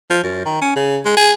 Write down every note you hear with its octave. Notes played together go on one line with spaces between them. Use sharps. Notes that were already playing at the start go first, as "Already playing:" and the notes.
F3
F#2
D#3
C#4
C#3
G#3
G#4